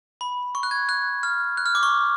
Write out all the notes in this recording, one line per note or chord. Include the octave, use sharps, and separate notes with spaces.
B5
C#6
F#6
G#6
F#6
F6
F#6
F6
D6
C#6